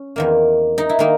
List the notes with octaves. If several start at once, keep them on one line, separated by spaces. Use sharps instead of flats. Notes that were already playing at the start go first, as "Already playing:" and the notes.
Already playing: C#4
E2 D#3 A#3
D#4
E4
D#3 A#3 D#4